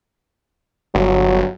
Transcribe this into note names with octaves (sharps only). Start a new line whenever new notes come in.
G1 F#3